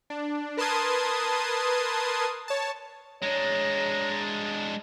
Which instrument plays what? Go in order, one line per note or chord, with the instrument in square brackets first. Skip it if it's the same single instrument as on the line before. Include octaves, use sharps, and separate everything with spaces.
[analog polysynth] D4
A#4 B4 A5 C6 D#6 G#6
C#5 A5
[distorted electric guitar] G#3 D4 [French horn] C#5 [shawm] A#5